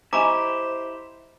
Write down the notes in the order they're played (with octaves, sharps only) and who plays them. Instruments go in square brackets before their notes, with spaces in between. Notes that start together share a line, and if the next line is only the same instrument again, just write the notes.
[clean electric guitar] E4 G4 [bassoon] C5 [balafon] D#5 G#5 C#6 [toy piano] A#5 D6